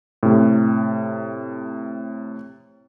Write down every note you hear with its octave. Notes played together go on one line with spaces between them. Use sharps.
A2 C3